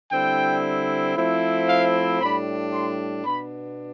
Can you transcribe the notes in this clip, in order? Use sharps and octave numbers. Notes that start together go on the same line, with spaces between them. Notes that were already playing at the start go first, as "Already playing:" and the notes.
D3 G3 C4 E4 G5
F3 A3 C4 E4
F5
A2 G3 D4 B5
C6
B2 B3 D4 B5